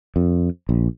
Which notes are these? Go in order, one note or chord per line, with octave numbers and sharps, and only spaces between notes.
F2
A#1